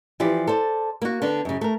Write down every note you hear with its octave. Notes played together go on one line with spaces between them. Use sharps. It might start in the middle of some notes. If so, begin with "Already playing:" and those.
E3 F3 G4 D5
A4 C5 D5
A#3 F#4
D3 B3 D4
F#2 C#3
A3 A#4